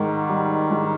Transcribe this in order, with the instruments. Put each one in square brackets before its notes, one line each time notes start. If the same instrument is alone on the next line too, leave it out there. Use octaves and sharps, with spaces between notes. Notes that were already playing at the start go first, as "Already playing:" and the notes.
Already playing: [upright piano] G#2 [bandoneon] D#3
[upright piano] G3
G#2